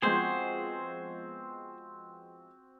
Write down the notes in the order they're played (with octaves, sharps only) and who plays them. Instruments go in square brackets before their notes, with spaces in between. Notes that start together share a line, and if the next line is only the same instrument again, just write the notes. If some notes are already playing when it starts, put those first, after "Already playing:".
[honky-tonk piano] F3 G#3 B3 [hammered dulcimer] C4 F#4 [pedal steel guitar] G#4 C5